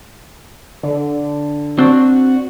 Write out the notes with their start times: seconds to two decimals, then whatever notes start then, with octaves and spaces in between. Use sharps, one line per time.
0.83 D3
1.79 C4 D4 F#4